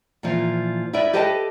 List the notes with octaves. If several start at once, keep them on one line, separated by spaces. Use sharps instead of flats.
A#2 E3 F3
E4 A#4 B4 D5 E5
G4 A4 B4 D#5 G5 A5